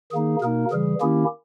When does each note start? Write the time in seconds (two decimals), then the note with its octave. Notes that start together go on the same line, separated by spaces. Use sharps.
0.12 D#3 A#3 D#4 G#4
0.42 B2 A#3 D#4 A#4
0.71 C#3 E3 G3 G#4
1.01 D#3 A#3 C#4 E4 G4